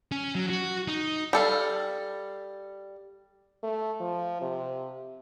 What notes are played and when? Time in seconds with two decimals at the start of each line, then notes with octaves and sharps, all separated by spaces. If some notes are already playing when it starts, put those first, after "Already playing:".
0.12 C#4
0.35 F#3
0.50 F#4
0.88 D#4
1.33 G3 A4 F5
3.63 A3
4.01 F3
4.41 C3